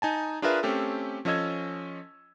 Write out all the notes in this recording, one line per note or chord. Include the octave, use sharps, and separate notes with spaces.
D#4 G#5 A5
D4 F4 G#4 A#4 B4 E5
A3 C4 C#4 G4 A4
F3 C#4 A4 D#5 E6 G#6